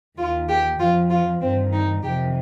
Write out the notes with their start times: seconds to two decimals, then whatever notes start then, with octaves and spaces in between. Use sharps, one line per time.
0.17 D#2 D#3 F4
0.48 G4
0.79 F2 F3 F4
1.10 F4
1.41 G2 D#3 C4
1.72 D#4
2.03 F2 C3 D#3 G4